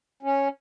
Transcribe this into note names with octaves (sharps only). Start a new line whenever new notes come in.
C#4